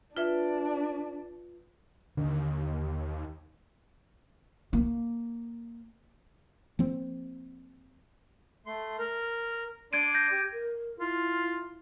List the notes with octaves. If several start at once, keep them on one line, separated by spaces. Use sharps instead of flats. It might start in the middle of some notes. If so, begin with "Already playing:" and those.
D4 F4 B4 E5
D#2 D3
A#3
F3 A#3 C4
A3 C6
A#4
D4 D5 C6 G#6 D7 D#7
G6 A#6
G4
A#4
E4 F4